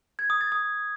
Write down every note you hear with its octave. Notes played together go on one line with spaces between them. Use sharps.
G#6
D#6
A6
D#6